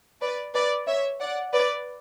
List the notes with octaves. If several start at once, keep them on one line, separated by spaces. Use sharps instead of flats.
B4 D5
B4 D5
C#5 E5
D5 F#5
B4 D5